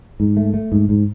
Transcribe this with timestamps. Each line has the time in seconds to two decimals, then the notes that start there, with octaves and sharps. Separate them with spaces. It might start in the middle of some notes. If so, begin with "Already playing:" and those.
0.20 G#2
0.37 A3
0.54 A3
0.72 G#2
0.89 G#2